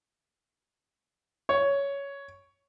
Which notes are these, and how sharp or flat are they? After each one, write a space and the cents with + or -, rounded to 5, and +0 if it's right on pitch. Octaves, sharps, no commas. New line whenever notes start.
C#5 +10